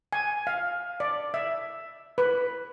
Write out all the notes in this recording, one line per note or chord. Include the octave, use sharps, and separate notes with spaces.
G#5
F5
D5
E5
B4